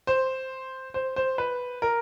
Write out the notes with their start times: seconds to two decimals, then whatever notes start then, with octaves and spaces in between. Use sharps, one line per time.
0.07 C5
0.94 C5
1.16 C5
1.38 B4
1.82 A#4